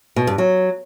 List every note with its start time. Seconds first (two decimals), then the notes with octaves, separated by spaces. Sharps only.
0.16 B2
0.27 G2
0.38 F#3